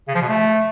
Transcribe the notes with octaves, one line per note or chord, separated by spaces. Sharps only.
C#3
F3
B2
A3